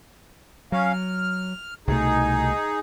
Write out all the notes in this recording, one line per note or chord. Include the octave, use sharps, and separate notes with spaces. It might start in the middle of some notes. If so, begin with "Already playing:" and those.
F#3 C#4 F5
F6
C2 B2 A3 D#4 G#4